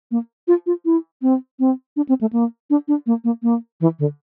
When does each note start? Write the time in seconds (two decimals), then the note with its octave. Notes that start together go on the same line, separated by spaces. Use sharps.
0.11 A#3
0.48 F4
0.66 F4
0.85 E4
1.22 C4
1.60 C4
1.96 D4
2.09 C4
2.21 A3
2.33 A#3
2.70 D4
2.88 D4
3.06 A#3
3.24 A#3
3.43 A#3
3.81 E3
3.99 D3